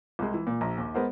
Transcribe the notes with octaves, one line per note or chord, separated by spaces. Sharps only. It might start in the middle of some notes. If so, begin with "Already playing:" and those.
C2 G#3
E3
A#2
A#1 A#5
D#2
G#3 B3 A#4 C5 F#5